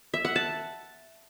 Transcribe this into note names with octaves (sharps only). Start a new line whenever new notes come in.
E5
F#5
A5